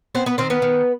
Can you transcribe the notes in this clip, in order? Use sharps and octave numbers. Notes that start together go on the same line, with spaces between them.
B3 C4 C5
B3 B4
D#3 C4 C5
B3 B4
D#3